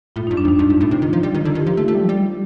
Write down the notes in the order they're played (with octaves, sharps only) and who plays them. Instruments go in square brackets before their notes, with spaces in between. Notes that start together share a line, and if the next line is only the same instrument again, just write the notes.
[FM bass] A2 [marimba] F4
[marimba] D#4
[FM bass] G2
[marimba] D4
[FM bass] F2
[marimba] D#4
[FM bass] G2
G2
A2
C3
[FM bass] D#3 [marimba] F4
[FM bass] F3
G3
D#3
[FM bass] D3 [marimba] F4
[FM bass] D#3
[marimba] G4
[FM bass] F3
[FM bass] A3 [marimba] F4
[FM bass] A3
G3
F3
G3